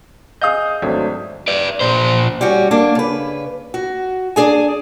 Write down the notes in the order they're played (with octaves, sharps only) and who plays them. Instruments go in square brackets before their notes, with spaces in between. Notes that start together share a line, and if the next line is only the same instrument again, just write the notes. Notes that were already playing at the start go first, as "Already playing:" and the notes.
[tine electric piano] G#4 G6 [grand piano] D#5 F5 D#6
[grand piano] G#1 [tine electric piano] F#3 A3 D4
[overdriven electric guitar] B4 D5
A#2 C5
[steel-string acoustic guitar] G3 C#4 F#4
A#3 D4
C#3 B4
F#4
D4 G#4 G#5